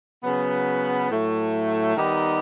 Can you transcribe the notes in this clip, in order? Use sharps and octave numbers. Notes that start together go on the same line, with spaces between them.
C#3 F#3 B3
A2 F#3 A3
D#3 G3 B3 D#4 G4